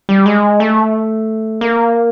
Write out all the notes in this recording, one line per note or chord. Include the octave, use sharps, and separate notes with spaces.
G3
G#3
A3
A#3